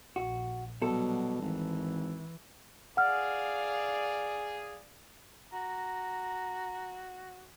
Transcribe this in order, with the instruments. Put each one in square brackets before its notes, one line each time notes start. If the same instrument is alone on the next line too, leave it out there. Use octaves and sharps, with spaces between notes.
[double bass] A#1 [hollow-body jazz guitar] F#4
[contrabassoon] B2 [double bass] F#3 G3 [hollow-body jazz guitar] A4
[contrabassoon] G#1 [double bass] E3
[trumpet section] G#4 [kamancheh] D5 F5 [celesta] F#5 F6
[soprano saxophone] F#4 [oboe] A#5